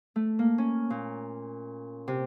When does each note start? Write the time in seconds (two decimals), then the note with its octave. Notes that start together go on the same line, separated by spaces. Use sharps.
0.16 A3
0.39 A#3
0.58 C#4
0.90 A#2
2.08 C3